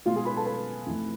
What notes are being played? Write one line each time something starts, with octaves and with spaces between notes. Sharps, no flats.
B2 G#3 F4 F5
G#4 G#5
B4 B5
A4 A5
B4 B5
F2 E3 A3